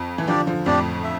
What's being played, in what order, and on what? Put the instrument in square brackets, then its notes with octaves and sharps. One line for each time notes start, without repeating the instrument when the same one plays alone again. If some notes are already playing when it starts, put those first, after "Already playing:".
Already playing: [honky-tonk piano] F2
E3
[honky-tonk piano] D3 F3 [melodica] D4 G4 D5
[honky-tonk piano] D3 F3
[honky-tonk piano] F2 A2 [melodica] D4 G4 D5
[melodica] E5